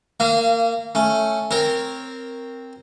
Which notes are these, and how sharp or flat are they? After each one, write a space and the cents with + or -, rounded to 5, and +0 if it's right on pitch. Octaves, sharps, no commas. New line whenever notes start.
A#3 -20 F5 -35
A3 +0 C#4 +0
C4 +0 A#4 +0 C#5 -15